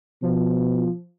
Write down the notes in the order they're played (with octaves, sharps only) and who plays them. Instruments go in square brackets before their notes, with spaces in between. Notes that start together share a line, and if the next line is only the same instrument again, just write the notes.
[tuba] B2 [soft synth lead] F3